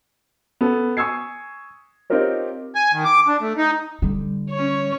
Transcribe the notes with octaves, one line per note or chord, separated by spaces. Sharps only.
B3 A4
G#5 C#6 D#6 E6 G#6 C7
C4 D#4 F4 G4 A#4 C#5
G#5
D#3
D6
D4
A3
D#4
D3 G3
C#4 C#5